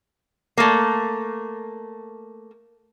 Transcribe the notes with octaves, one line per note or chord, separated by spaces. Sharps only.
A3 A#3